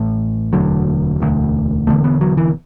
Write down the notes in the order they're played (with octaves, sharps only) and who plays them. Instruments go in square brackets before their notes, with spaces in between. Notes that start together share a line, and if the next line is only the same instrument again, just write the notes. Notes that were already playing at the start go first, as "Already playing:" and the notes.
Already playing: [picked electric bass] A1 A2
E1 D2 D3 F#3
E1 D2 D3
E1 E2 D3 A3
B3
F#3
E3